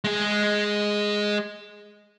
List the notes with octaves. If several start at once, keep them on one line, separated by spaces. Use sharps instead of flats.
G#3 G#4